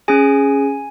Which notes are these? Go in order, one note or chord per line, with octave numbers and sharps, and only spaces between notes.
C#4 G#4 G#5